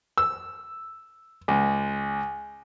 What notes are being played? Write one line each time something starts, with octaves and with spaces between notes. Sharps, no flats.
E6
C#2